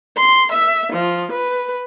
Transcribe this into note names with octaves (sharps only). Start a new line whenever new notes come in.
C6
E5
F3
B4